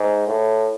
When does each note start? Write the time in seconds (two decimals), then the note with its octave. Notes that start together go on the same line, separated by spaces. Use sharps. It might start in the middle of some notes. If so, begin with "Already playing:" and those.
Already playing: G#2
0.27 A2